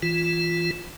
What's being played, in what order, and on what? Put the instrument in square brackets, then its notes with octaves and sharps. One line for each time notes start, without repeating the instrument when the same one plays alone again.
[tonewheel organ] E3 F4